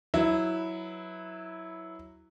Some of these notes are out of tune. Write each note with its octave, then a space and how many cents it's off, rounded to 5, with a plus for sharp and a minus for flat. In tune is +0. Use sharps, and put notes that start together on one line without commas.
F#3 +0 E4 -10 B4 +0